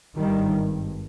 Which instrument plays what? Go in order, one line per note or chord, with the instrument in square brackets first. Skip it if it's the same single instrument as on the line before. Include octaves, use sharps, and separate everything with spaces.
[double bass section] G#1 G2 D#3 G3